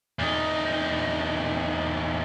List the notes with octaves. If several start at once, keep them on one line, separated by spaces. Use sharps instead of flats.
E2 D#4